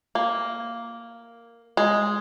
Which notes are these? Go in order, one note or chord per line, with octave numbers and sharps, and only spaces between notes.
A#3
G#3